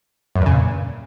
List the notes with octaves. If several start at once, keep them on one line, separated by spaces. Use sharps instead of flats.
F#2
E2
C#3
A#2